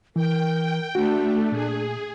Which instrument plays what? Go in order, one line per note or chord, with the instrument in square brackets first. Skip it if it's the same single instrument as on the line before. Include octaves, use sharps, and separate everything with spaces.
[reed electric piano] E3 [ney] A#4 [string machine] G5
[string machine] A3 [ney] D4 [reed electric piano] F#4
[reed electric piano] A#2 [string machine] G#4